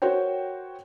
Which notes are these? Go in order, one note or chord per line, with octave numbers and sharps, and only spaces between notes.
F#4 A#4 C5 C#5 G5